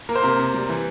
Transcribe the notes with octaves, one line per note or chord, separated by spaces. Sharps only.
A#3 A#4
C5
C3 A#3 A#4
C3
G3
E3